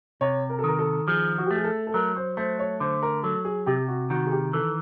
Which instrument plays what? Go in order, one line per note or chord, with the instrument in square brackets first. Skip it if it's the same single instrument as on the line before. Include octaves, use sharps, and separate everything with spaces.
[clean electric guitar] C3 [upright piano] C#5
[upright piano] A#4
A4
[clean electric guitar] D#3 [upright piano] A#4
[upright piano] A4
[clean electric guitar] F3 [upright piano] G#4
[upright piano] F#4
G4
[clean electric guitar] A3
[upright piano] G#4
A4
A4
[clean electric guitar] F#3 [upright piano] A#4
[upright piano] C5
[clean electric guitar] A3 [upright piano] C5
[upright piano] C#5
[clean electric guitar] D3 [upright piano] C5
[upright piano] A#4
[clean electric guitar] F#3 [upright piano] A4
[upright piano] G#4
[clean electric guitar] C3 [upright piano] G4
[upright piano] F#4
[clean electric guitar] D#3 [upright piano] F#4
[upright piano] G#4
G4
[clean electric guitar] E3 [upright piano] A4